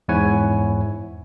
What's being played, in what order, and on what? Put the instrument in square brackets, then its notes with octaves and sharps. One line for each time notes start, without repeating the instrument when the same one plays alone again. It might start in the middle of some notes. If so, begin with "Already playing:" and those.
[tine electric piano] E2 G#2 E4 C#5 F#5 G#5